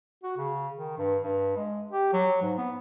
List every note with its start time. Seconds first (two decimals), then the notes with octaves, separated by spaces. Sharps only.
0.23 F#4
0.37 C#3
0.74 D#3
0.98 G2
1.23 G2
1.56 G#3
1.91 G4
2.13 F#3
2.42 G#2
2.58 B3